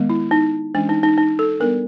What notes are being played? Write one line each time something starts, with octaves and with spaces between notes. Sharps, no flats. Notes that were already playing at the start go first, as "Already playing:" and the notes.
Already playing: D#3 G#3 B3
E4
D#4
E3 G#3 C#4 D4
D#4
D#4
D#4
A4
G3 B3 D4 A#4